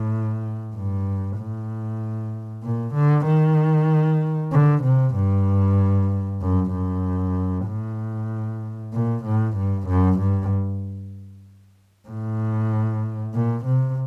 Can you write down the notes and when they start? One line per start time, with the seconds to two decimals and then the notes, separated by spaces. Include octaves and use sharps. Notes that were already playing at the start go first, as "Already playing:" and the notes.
Already playing: A2
0.74 G2
1.38 A2
2.63 A#2
2.94 D3
3.26 D#3
4.52 D3
4.83 C3
5.15 G2
6.41 F#2
6.73 F#2
7.67 A2
8.93 A#2
9.25 A2
9.56 G2
9.88 F#2
10.20 G2
12.08 A2
13.34 A#2
13.65 C3